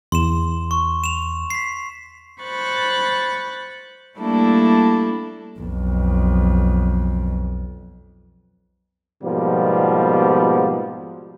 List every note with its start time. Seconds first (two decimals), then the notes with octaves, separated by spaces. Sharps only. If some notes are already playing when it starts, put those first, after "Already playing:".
0.12 E2 C6 E7
0.71 C#6
1.04 E7 F7
1.50 B6 C7
2.41 C5 B5 C#6 F#6 A6
4.18 G3 A3 A#3 D4 E4 A4
5.59 B1 F2
9.23 G#2 B2 F3 G3 A#3 B3